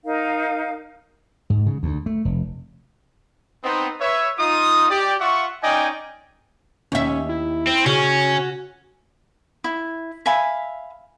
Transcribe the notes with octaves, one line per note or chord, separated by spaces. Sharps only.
D#4 A#4 F5
G#2
C#3
D2
A3
F1
B3 C4 D#4
B4 C#5 E5
D#4 F4 D#6
G4 D5
F4 E5 F#5 C#6
C#4 D#4 D5 D#5 G5 G#5
D#2 C#4 E5
E4
C4
C#3 C#4 F#4
E4
E5 F5 G#5 B5